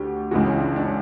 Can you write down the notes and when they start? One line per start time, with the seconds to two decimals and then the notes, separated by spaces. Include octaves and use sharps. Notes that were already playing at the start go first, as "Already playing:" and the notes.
Already playing: D2 D3 G4
0.31 C#2 C#3 E3 F#4
0.46 C#4
0.60 D4
0.76 D4
0.84 C#4